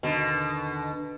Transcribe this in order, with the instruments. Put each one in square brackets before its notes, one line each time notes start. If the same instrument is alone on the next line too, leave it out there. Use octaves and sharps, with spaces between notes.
[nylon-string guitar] D#2 D3 [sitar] B2